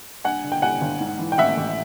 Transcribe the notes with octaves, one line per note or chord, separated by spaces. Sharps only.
G2 F#5 G#5
D3
G5
G3 F#5 G#5
G1
G#2
E3
G5
A1 E5 F#5
A1